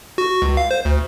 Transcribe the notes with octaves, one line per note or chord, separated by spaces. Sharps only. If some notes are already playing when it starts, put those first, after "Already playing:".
F#4
C#2
F5
C5
D2